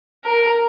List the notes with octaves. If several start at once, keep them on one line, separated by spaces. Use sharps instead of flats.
A#4